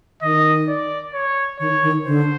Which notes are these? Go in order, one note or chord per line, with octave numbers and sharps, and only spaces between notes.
D#3 D#5
D5
C#5
D#3 C#5
D#3
D3 C5